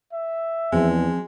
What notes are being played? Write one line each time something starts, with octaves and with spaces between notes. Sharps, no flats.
E5
E2 F3 G#3 C4